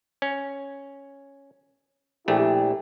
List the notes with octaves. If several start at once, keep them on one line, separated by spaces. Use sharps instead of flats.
C#4
A#1 A3 E4 G4